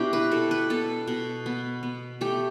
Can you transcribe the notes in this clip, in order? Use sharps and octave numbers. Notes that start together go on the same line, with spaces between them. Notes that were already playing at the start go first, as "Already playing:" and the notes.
Already playing: B2 D4 E4 G4
B4
B2 A4
B4
B3 A4
B2
B3
B3
A3 G4